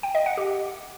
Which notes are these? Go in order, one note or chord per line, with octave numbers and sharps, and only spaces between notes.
G5
D#5
F#5
G4